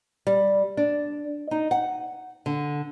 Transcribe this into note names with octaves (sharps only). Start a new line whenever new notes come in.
G3
D4
D#4
F#5
D3